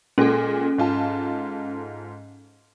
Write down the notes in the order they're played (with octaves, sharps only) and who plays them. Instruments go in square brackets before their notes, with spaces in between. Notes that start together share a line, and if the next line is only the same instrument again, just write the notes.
[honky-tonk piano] A#2 G#3 [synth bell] C#4 A4
[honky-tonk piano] G#2 F4 A5